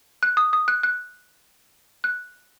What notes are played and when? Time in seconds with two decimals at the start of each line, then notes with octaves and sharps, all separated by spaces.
0.23 F#6
0.37 D#6
0.53 D#6
0.68 F#6
0.83 F#6
2.04 F#6